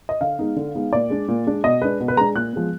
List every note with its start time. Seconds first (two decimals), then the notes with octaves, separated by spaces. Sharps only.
0.09 D#5
0.21 D3 F5
0.39 G#3 B3 D#4
0.56 D3
0.75 G#3 B3 D#4
0.93 A#2 D5
1.10 G#3 D4
1.28 A#2
1.47 G#3 D4
1.64 B2 D#5
1.82 G#3 D4 B4
2.00 B2
2.08 B4
2.17 G#3 D4 A#5
2.35 A#2 F#6
2.53 F3 G#3 B3